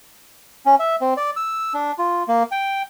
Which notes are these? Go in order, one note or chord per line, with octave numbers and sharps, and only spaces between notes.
C#4
E5
C4
D5
E6
D4
F4
A#3
G5